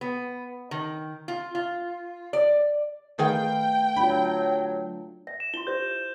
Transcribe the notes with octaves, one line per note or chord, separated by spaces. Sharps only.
B3
D#3
F4
F4
D5
D#3 A3 G#4 B4 F5 G5 A6
F#3 D4 F4 B5
E5
E7
E4 F4 C6 G7
G4 C5 E5 G6